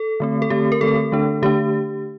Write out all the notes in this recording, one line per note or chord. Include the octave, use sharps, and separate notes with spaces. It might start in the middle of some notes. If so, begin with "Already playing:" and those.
Already playing: A4
D3 A3 C4
A4
D3 A3 C4 G4
A#4
D3 A3 C4 A4
D3 A3 D4
D3 A3 D4 G4